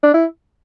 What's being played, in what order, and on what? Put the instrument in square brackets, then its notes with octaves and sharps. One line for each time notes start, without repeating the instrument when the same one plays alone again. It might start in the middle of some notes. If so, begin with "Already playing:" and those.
[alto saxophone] D4
E4